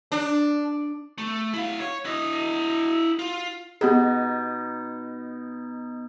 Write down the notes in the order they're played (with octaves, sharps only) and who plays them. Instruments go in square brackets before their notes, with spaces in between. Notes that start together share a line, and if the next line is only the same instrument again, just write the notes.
[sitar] D4
[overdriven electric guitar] A3
E4 F5
C#5
E4 D#5
F4
[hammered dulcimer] B2 D#4 [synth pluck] B3 G4 G#4